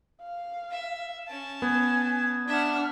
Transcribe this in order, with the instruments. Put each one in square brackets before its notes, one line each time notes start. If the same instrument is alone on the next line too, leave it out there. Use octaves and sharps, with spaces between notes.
[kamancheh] F5
[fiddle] E5
C#4 A5
[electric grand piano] B3 [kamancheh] G#5 [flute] G#6
[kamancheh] D4 F6 [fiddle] E5 F#5